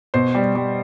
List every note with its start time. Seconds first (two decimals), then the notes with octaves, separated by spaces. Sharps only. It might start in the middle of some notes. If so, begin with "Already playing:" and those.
0.14 B2 C5
0.35 G3
0.55 G3